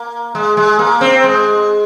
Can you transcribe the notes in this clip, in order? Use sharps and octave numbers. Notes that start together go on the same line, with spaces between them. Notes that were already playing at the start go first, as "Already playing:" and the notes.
Already playing: A#3
G#3
G#3
A#3
C4
G#3